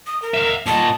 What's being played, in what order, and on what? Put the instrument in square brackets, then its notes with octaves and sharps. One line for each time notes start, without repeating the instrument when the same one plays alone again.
[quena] D#6
A#4
[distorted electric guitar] E5 F5
[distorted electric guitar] A#2 D#5 [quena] A5